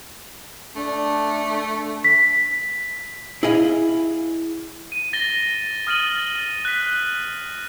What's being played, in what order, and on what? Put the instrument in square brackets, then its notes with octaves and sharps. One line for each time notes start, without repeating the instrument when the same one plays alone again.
[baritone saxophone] A3 [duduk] D4
[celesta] B6
[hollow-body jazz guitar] E4 G#4 D#5 F5
[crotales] D#7
A6 A#6 G7
D#6 F6 A6 D#7 F#7
F#6 B6